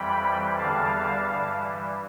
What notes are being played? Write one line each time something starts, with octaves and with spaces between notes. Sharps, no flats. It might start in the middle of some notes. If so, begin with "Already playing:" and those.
Already playing: F2 E3 G3 G5 B5
E2 D3 G3 F5 A5
G2 E3 G3